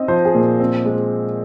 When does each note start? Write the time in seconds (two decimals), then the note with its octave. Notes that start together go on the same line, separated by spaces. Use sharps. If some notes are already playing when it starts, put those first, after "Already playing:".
Already playing: C4 D#4 D#5
0.08 F3 C5
0.25 G#4
0.34 A#2
0.60 C4
0.86 G#3